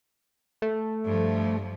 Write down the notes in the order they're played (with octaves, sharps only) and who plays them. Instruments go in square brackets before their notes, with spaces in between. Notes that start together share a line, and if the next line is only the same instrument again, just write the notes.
[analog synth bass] A3
[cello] G2 F3